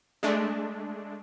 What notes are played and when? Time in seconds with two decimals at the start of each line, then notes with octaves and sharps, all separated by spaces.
0.23 G#3 A3 D4